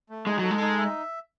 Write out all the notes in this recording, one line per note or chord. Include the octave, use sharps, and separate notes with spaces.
A3
G#3 D#4
F#3 A4
G#3
D#4
E5